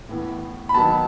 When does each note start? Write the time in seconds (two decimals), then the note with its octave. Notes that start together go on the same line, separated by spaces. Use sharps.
0.09 A2 E3 B3
0.69 B5
0.74 D#3 F#3 B3 A5